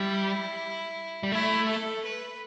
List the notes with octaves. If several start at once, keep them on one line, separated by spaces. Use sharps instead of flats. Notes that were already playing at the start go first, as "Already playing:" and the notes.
Already playing: G3 E4
G3
A3 E4
A4
B4